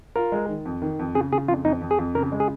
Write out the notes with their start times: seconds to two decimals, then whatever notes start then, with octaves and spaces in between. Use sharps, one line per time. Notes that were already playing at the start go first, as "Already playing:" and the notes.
0.16 F4 A#4
0.32 G#3
0.48 D#3
0.65 F2
0.82 D#3
0.99 F2
1.15 C#3 G#4
1.32 C#3 G#4
1.48 F2 F4
1.65 F2 D#4
1.81 F2
1.91 G#4
1.99 F2
2.15 C#3 A#4
2.32 G#3
2.40 G#4